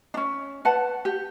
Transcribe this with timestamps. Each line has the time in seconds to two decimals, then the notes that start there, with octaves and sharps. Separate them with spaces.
0.14 C#4 D4
0.65 B4 F#5 A5
1.05 G4